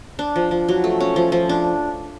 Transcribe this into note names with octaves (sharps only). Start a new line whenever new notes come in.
D4
F3
F3
F#3
A3
C#4
F3
F3
D4